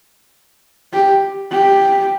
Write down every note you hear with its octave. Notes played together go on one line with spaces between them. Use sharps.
G4
G4